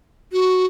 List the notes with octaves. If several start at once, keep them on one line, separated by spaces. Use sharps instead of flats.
F#4